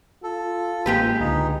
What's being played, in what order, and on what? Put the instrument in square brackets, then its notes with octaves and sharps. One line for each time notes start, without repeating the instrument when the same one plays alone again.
[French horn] F4 [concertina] A4
[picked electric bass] A1 A#3 [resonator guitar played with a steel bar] G#3 G4 B4
[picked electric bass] C#2 D3 [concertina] D#4